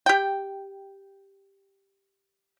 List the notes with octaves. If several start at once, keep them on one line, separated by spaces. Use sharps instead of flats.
G4 G5